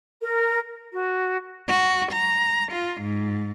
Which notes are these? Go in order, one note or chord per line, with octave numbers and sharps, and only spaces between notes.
A#4
F#4
F#4
A#5
F4
G#2